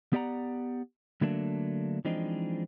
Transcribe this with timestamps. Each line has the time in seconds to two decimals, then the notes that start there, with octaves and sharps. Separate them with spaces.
0.13 B3 G4 D5 F#5 A#5
1.21 D3 F#3 A3 A#3 D4
2.05 E3 F3 G#3 C4 D4 D#4